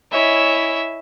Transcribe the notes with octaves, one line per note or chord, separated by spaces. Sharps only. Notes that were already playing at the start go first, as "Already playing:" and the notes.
E4 C#5 D#5 E5 G#5